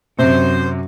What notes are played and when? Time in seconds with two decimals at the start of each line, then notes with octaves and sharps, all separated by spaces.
0.19 F#2 C3 C5